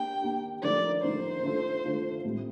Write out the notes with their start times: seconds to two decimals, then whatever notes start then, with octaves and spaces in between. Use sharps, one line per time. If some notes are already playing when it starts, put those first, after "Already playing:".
Already playing: A#3 D4 G4 G5
0.22 A#3 D4 G4
0.63 D3 F3 A3 D#4 A#4 D5
1.03 D3 F3 A3 D#4 A#4 C5
1.43 D3 A3 D4 F4 A4
1.84 D3 A3 D4 F4 A4
2.25 A2 G3 C4 G4